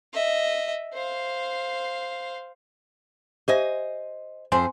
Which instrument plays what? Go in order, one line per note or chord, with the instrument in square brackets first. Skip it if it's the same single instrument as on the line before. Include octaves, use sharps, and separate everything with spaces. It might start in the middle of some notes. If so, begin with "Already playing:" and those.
[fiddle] D#5 E5
C5 F5
[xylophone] G4 E5 [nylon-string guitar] C5 D#5 G#5
[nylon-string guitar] F2 C5 [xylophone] G#5 C6